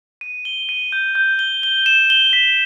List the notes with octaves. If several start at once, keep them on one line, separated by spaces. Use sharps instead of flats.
D#7
G7
D#7
G6
G6
G7
G7
E7
G7
B6